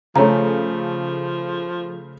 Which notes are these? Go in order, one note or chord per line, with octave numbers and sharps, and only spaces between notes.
C#3 F3 A3 C#5 A#5